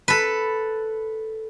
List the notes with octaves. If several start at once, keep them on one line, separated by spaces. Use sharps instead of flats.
A4 B4